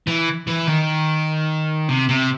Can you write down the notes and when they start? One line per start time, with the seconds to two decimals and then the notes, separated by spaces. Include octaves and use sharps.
0.07 E3
0.47 E3
0.67 D#3
1.89 C3
2.09 C3